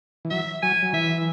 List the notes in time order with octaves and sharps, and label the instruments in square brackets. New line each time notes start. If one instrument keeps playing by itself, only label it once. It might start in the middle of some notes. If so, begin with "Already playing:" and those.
[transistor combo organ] E3
[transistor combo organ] F#3 [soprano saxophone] E5
[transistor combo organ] F#3 [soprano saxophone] G#5
[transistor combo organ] F#3
[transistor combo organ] E3 [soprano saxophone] E5